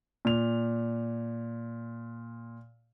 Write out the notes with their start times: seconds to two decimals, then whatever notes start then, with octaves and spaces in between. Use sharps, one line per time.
0.25 A#2 F7